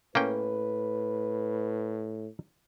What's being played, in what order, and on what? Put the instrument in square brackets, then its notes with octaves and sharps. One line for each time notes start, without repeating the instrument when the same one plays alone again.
[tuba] A2 [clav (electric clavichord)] A#3 C#4 G5 [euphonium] B4